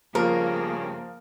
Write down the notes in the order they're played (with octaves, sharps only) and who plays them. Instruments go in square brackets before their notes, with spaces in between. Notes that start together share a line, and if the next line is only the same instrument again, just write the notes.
[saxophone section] G2 C#3 [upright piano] F3 [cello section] A#3 [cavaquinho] A#4